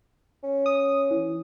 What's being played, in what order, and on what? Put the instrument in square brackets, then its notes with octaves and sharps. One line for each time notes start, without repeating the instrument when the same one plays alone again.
[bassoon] C#4
[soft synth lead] D#6
E3